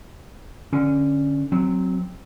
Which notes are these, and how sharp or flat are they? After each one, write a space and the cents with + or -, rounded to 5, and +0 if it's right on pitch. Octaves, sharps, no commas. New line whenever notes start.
D3 +0 C#4 +0
F#3 +0 C4 +0